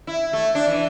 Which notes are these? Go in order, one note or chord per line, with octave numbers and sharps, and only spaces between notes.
E4
A3
D4
E3